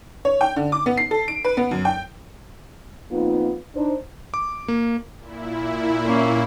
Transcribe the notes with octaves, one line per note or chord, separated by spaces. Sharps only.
C#5
G5
D3
D6
B3
C7
A4
D7
B4
B3
F#2
G5
F2 A#3 B3 D#4 F4
D4 D#4 C5
D6
A#3
A#2 E4
A#3 C#4